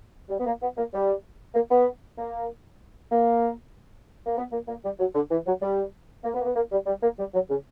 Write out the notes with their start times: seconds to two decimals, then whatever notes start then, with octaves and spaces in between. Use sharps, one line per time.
0.30 G3
0.39 B3
0.46 A#3
0.62 B3
0.77 A#3
0.93 G3
1.55 A#3
1.71 B3
2.18 A#3
3.12 A#3
4.26 A#3
4.37 B3
4.52 A#3
4.68 A#3
4.84 G3
4.99 F#3
5.15 D3
5.31 E3
5.47 F#3
5.62 G3
6.24 A#3
6.34 B3
6.41 A#3
6.45 B3
6.55 A#3
6.72 G3
6.87 G3
7.02 A#3
7.18 G3
7.34 F#3
7.50 C#3